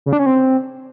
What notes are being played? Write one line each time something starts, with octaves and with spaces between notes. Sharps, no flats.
C#3
D4
C#4
C4